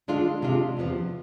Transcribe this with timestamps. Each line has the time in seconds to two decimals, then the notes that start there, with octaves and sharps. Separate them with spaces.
0.08 D3 G#3 D4 F4
0.42 C3 G#3 D4 F4
0.77 E2 C3 F3 B3